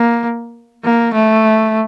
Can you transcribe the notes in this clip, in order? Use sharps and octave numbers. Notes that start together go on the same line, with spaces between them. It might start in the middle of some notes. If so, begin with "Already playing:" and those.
Already playing: A#3
A#3
A3